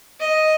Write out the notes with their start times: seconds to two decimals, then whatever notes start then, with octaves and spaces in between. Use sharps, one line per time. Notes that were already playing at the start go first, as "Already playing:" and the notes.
0.20 D#5